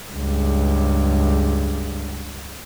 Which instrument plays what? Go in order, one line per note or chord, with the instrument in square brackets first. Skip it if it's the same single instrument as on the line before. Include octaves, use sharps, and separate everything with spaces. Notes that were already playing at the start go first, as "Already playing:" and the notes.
[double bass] C#2 G2